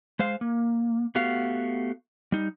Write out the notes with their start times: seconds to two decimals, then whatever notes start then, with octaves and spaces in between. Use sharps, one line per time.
0.19 G#3 C5 F5
0.41 A#3
1.15 A3 B3 F#4 G4 F5
2.32 G3 D#4